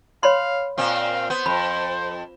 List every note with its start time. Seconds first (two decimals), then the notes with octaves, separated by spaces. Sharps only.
0.23 C#5 F5 B5 C6
0.78 A#2 C4 F5
1.30 B3 C5
1.46 F2 B5